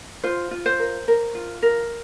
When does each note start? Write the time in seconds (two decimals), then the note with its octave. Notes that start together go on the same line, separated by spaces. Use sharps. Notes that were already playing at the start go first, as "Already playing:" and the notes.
0.24 F4 C5
0.51 F4
0.66 C5
0.79 A#4
1.08 A#4
1.35 F4
1.63 A#4